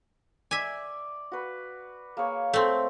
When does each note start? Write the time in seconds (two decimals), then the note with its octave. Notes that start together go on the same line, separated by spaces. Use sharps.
0.51 D5 E5 G#5
1.32 F#4 B4
2.17 A#3 G#4 C#5
2.53 A3 C4